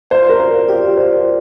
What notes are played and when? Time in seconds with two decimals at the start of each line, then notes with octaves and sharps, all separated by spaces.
0.10 F4 C5 D5 F5
0.29 A#4
0.40 C5
0.68 F4 G4 D5 F5
0.97 C5